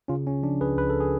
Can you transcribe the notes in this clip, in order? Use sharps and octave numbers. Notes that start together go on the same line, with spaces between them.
C#3 C#4 F4
C#3 C#4
F3 D4
C#2 G#4 B4
C#2 B4
A4
G#4